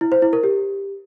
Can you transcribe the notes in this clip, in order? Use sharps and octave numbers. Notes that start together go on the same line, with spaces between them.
E4
C5
E4
A#4
G4